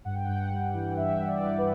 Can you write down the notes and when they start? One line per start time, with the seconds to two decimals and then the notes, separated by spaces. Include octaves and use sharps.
0.05 G2 F#5
0.14 G5
0.24 G2 F#5
0.51 G3
0.73 E3
0.97 G2 E5
1.20 G2
1.27 D5
1.43 G3
1.58 B4